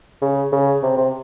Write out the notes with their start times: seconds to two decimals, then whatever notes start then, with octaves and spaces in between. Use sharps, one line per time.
0.22 C#3
0.52 C#3
0.83 C3
0.98 C3